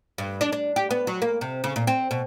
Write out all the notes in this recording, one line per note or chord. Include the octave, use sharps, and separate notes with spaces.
G2
D4
D4
G4
B3
F#3
A#3
C3
C#3
A#2
C4
B2